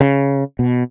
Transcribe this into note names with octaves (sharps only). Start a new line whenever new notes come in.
C#3
B2